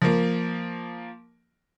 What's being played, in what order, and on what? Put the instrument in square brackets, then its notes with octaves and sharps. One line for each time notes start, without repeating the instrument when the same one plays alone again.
[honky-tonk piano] F3 A#3